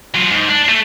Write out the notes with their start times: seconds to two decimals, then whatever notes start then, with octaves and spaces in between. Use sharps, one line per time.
0.15 F#3 F4
0.30 G#2
0.49 D4
0.69 A3